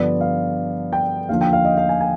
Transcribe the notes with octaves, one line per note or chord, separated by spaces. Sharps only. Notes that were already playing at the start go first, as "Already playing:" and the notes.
Already playing: G2 D3 F3 B3 D4 D5
F5
G5
D#2 D3 F3 F5
G5
F5
D#5
F5
G#5
G#5